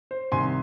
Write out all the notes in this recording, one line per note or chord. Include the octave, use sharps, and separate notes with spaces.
C5
C2 C3 D#3 G#5 C6